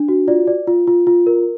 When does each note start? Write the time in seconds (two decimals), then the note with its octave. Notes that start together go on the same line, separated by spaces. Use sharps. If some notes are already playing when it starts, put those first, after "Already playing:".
Already playing: D4
0.08 F#4
0.28 F4 D5
0.47 D5
0.67 F4
0.87 F4
1.07 F4
1.27 A#4